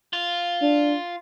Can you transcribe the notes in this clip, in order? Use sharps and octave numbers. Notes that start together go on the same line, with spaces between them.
F4
D4